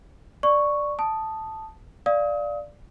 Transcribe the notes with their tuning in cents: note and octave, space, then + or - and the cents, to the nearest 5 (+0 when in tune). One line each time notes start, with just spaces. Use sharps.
D5 +5 C#6 +0
A5 +0 D#6 -5
D5 +0 F5 +0 D#6 +35